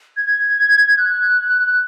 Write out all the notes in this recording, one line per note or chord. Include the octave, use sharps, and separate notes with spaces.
G#6
F#6